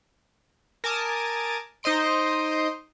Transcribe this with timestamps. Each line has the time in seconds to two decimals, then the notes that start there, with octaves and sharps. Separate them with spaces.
0.84 A#4 G#5 A5 D6 D#6
1.83 D#4 C5 D#5 C6 D7